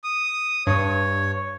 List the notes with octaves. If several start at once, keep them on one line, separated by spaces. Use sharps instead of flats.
D#6
G2 C#5